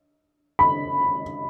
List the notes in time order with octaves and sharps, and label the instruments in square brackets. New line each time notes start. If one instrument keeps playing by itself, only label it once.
[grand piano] B5